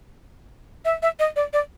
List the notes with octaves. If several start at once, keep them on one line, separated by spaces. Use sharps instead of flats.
E5
E5
D#5
D5
D5